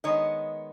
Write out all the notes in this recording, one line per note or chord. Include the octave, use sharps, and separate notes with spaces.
D#3 G#3 B3 C#5 D#5